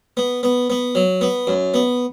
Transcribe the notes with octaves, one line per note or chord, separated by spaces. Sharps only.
B3
B3
B3
F#3
B3
F#2
B3